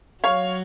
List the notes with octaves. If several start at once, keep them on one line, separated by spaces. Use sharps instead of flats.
F#3 C#5 F5